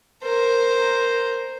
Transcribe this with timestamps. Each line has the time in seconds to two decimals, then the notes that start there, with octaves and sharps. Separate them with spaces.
0.23 A#4 C5